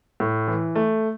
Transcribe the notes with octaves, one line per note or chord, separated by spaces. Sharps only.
A2
E3
A3